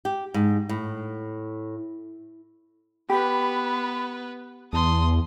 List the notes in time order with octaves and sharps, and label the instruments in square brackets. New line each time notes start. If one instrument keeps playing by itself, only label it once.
[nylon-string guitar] G4
G#2
A2
[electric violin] B3 B4 [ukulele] G4 [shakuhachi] B5
[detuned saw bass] E2 [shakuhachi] A5 [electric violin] C6 D#6